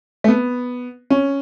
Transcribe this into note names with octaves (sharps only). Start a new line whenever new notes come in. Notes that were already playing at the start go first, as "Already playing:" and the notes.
A3
B3
C#4